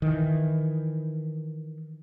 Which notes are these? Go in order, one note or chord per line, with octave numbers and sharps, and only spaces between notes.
D#3 E3